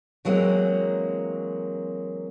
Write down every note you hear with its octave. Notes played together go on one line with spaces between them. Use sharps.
E3 F#3 G#3 A#3 C4